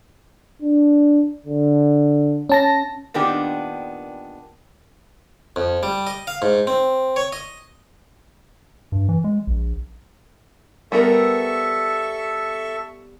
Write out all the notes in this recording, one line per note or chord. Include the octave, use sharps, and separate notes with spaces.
D4
D3
C#4 A5 A#6
A#2 D#3 B3 D4 G4
F2
G3
D#5
F5
G#2
C4
C#5
D#5
G2
E3
G#3
A#1
G3 B3 A4 A#4 E5 C#6